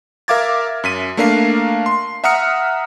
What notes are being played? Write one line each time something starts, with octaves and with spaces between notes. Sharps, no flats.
A#4 E5 F5 D6 G#6 A6
F#2 B6 D#7
A3 A#3 D4 A#4 F5 C7
C6
E5 F#5 A#5 D#6 F6 C#7